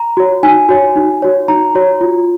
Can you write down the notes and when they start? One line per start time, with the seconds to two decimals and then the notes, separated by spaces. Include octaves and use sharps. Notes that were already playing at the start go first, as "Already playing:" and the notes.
Already playing: A#5
0.17 F#4 C#5
0.43 D#4 G#5
0.69 F#4 C#5
0.96 D#4
1.22 F#4 C#5
1.48 D#4 A#5
1.75 F#4 C#5
2.01 F4